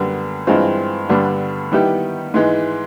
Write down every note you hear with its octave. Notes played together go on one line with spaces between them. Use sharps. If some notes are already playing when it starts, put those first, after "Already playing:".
Already playing: F#2 D3 G3 B3
G2 E3 G#3 C4 F4
G2 D3 G3 B3 D4
D#3 G3 B3 E4 G4
G#2 E3 G#3